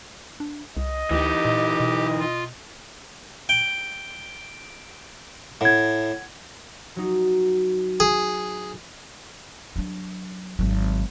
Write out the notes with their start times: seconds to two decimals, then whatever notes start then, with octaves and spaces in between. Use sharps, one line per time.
0.40 D4
0.77 C2 D#5
1.11 D2 E3 D#4 G4
1.45 A#2
1.80 B2
2.19 F4
3.49 G5
5.61 A2 F#5 G#6
6.96 F#3 D#4
8.00 G#4
9.76 F#3 D4
10.59 G#1 F#3